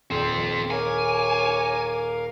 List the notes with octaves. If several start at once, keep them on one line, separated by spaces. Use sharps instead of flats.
D#1 C4 F4
A#4 C#5 F5 G#5 D6